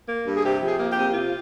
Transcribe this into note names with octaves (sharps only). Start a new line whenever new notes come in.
A#3
G2
G#4
C3 G4
F3
G#4
A#3
G4
C3
C3 F4